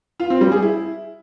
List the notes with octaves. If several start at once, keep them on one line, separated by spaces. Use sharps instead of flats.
F4
C4
G3
G#4
E4